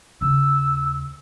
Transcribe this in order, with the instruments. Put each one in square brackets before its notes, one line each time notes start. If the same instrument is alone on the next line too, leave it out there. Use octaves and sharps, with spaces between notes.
[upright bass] D#2 C#3 [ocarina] E6